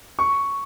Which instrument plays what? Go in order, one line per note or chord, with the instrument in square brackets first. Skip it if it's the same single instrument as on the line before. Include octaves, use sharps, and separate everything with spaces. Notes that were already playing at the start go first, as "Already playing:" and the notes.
[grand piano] C#6